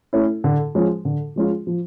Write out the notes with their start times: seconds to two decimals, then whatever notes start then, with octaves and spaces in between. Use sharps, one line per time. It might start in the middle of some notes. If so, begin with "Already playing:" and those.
0.13 A3 C#4 E4
0.44 D3
0.75 F3 G#3 C#4 F4
1.05 D3
1.36 F3 G#3 C#4 F4
1.67 F3